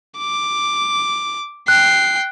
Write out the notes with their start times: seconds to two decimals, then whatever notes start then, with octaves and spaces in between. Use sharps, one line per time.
0.19 D6
1.68 G5 F#6 C7